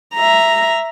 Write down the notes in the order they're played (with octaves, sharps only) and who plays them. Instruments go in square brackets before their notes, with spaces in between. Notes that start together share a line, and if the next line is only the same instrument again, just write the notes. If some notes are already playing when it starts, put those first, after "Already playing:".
[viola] E5 A#5